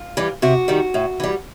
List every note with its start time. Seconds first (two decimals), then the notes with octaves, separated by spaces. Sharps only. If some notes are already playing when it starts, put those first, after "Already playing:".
Already playing: F4
0.17 E3 G3
0.42 C3 F#4
0.68 D#3 G3
0.94 A2
1.20 E3 G3